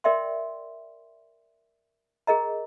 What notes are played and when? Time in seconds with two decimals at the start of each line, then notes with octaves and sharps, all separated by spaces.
0.04 A#4 D5 E5 G5 C6
2.27 G#4 A#4 D#5 A#5